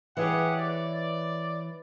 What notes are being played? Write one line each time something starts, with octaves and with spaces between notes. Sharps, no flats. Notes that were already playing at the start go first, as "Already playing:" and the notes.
E3 G4 G#4 C#5 F#5
D5